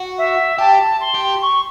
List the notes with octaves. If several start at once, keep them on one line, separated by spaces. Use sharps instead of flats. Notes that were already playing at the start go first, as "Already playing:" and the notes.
Already playing: F#4
E5
G4 A5
C6
G4
C#6